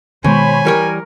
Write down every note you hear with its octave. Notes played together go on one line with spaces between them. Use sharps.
B2 D#3 G#3 C5 C#5 G#5 B5
E3 G3 A#4 C#5